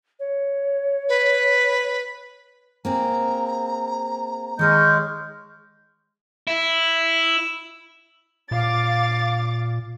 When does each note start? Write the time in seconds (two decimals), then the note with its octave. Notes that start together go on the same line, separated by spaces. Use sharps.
0.19 C#5
1.09 B4
2.85 A#3 C4 G#4 A#5
4.59 D#3 G#3 C#5 D#5 C#6 F6 G6
6.47 E4
8.51 A#2 F5 D6 A6